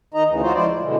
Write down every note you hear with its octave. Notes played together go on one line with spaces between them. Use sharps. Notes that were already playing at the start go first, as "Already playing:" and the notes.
D#3 D#4 D#5 A#5
D2 C#3 E3
G#3 D#4 F4 F#4 C5
F3 G#3 E4 C5 D5
A2
B2 D3 E3 G#3